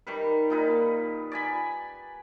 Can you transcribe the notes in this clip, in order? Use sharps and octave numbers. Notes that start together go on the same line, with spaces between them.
D#3 G3 B4
A#2 D#4 B4
D5 G#5 B5